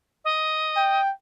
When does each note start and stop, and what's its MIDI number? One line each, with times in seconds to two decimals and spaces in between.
0.25 1.02 75
0.76 1.12 79